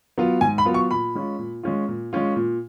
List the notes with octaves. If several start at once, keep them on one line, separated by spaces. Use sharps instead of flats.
F#3 B3 F4
G#2 G#5
B5
F#3 B3 F4
C#6
A#2 B5
G#3 C#4 F4
A#2
G#3 C#4 F4
A#2
G#3 C#4 F4
A#2